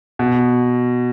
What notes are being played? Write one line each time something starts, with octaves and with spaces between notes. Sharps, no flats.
B2